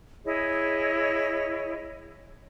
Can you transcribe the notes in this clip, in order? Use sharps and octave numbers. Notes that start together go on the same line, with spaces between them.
E4 G#4 C#5 D#5